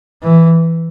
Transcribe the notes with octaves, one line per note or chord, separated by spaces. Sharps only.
E3